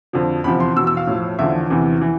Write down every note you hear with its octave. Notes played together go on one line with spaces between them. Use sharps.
F2 D3 F3
E2 C3 F3 B5
C6
E2 B2 E6
E6
F5
A2 F3
E2 D3 F3 E5
E2 C3 E3
E3